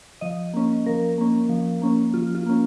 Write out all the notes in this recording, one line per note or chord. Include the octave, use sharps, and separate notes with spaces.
F3 D#5
A#3 C#4
F3 A#4
A#3 C#4
F3
A#3 C#4
F3 F4
F4
A#3 C#4